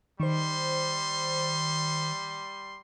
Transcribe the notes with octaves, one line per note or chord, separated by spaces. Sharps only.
D#3 G3 C5 C6